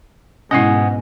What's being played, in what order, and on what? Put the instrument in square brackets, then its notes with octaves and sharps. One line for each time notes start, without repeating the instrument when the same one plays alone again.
[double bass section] G#2 B2 [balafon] C#4 E4 [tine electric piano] D#5 F#5 G#5